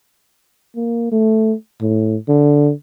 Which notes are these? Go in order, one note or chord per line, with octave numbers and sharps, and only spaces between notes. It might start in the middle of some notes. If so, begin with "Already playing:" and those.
A#3
A3
A2
D3